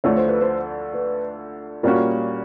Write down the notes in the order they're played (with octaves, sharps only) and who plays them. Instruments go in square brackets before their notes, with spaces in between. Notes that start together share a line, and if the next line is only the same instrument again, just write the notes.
[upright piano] D2 D3 F3 A3 [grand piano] C#5
[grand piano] C5
B4
C5
B4
[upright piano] A#2 G3 A#3 C#4 F#4 [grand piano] A#4